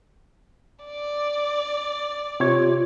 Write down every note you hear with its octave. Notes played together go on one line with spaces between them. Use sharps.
D5
C3 F4 C#5